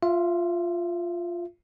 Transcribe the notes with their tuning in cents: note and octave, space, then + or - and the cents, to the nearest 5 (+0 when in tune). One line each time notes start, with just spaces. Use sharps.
F4 +0 E5 +30